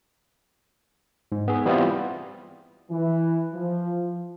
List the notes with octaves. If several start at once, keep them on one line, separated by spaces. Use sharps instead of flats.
G#2
B3 G#4
E3 G3 B3 C4 E4 F4
E3
F3